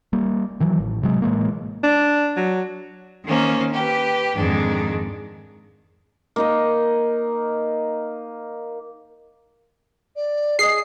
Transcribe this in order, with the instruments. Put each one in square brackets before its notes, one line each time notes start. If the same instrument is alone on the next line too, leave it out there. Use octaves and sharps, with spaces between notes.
[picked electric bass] G3 A#3
D#3 E3 F#3
A1
C3 F#3 G#3
A2 E3 G#3 A#3
[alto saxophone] D4
F#3
[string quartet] D#3 A#3 C#4 C5
G4 B4
F2 G#2 D#3 G#3 D4
[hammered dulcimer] A#3 D#4 D#5
[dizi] D5
[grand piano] G#4 D#5 [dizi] D#6 [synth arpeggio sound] C7